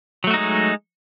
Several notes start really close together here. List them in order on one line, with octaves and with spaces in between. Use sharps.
F#3 A3 F#4 D#4 G#3